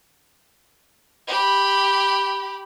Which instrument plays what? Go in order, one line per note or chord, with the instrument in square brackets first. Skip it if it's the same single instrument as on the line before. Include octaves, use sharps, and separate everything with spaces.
[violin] G4 B5